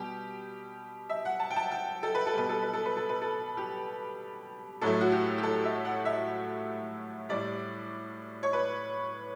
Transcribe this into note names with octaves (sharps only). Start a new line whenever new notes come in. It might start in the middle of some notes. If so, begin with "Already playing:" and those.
Already playing: B2 G3 G4
E5
F#5
A5
G5
A5
G5
A4
B4
A4
B2 G3 B4
A4
B4
A4
B4
A4
B4
A4
G4
A2 F#3 A3 A4
F#4
G4
G4
A4
E5
F#5
E5
A2 G3 D5
C#5
B4